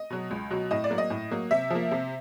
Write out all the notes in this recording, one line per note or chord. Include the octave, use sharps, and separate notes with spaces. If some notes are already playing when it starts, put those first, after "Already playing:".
Already playing: D#5
B2 F#3
C#2
B2 F#3
A2 D#5
D5
F#3 A#3
D#5
A2
F#3 A#3
C3 E5
F3 A#3
C3